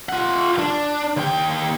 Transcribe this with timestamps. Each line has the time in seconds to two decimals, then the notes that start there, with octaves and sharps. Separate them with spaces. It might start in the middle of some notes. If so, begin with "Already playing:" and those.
0.09 F4 F#5
0.59 D4
1.17 D#2 G5